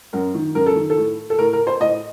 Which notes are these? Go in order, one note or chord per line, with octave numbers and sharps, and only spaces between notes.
F#2 A#4
D#3
F#2 A#4
A4
D#3
A4
A2
A4
A2 A#4
A#4
C5
A2 D#5